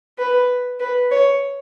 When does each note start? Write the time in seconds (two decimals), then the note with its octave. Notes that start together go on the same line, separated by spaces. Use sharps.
0.19 B4
0.80 B4
1.11 C#5